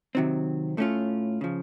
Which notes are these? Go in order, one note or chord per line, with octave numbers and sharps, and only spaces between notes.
C3 D#3 F#3 C4
A2 A3 C#4 F4
C#3 F3